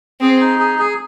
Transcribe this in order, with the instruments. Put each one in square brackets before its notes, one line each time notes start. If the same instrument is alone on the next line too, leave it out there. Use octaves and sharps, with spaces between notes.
[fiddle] C4 [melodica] G#4
[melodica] D#4
G#4
G#4